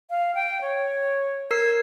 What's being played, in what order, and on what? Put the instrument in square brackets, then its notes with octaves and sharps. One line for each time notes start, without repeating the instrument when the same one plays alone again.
[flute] F5
G5
C#5
[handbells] A#4 E6 C7 [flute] G#6